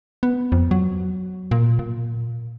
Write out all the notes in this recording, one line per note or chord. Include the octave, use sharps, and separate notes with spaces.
B3
F2
F#3
A#2
A#2